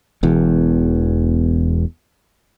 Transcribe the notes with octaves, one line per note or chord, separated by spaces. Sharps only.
E1 E2